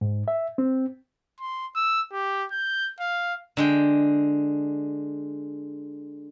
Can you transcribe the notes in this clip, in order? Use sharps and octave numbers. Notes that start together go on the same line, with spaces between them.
G#2
E5
C4
C6
E6
G4
G6
F5
D3 G#3 G5